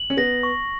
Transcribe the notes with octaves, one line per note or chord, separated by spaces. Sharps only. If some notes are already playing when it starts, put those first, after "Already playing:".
Already playing: F#7
C#4
B3 A#6
C#6